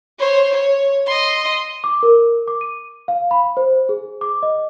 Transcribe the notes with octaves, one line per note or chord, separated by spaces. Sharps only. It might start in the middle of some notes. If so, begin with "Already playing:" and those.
C5 C#5
C#5
D#5 C6
D6
A#4
D6
D#7
F5
B5
C5
G#4
D6
D#5